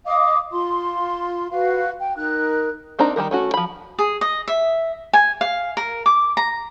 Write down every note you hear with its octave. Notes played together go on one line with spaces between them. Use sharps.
D#5 F5 D6 D#6
F4 C6
F#4 B4 F5
G5
D#4 A#4 F#6
A#3 C4 D4 D#4 A#5
D#3 E3 G3 A#4
A3 C#4 F#4
F3 B5
G#4
D#5
E5
G#5
F5
A#4
D6
A#5